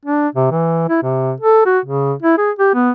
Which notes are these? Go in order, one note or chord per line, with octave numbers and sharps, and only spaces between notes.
D4
C3
E3
E4
C3
A4
F#4
C#3
E4
G#4
G4
B3